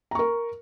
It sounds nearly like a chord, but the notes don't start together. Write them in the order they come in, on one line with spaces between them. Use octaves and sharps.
A#5 C#6 A#4